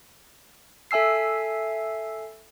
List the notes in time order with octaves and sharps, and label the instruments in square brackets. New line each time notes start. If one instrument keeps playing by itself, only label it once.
[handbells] A4 E5 G#5 E6 C7